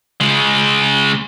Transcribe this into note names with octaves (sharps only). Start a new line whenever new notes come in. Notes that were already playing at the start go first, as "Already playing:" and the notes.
C#3 G#3